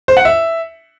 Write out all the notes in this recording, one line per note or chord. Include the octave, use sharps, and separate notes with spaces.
C5
F#5
E5